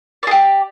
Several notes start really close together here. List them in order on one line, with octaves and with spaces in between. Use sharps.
D5 G#4 G4